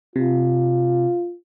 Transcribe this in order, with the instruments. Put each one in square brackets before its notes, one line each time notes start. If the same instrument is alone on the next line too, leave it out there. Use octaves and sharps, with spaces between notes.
[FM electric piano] C3 [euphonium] F4